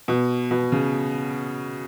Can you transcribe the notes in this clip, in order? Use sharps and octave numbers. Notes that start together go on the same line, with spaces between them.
B2
B2
C#3